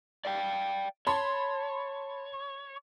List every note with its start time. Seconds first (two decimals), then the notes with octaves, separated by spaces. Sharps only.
0.25 D5 F5 G5
1.07 C#5 A5 B5 C6